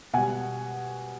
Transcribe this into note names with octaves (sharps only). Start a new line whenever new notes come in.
B2 G3 F#5 G#5